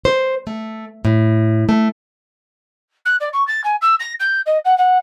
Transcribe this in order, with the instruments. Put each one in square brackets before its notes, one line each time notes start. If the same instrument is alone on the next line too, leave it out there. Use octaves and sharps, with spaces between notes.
[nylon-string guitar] C5
A3
A2
A3
[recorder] F#6
D5
C#6
A6
G#5
E6
A#6
G6
D#5
F#5
F#5